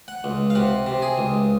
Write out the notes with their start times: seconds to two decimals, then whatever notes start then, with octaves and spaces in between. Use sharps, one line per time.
0.08 F#5
0.24 C#2
0.50 F5
0.55 C3 F#5
0.86 C3
1.02 G#4
1.18 C#2